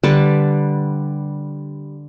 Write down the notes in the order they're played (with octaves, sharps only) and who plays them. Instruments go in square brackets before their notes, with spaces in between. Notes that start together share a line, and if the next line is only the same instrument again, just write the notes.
[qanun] D3 G3 B4 A5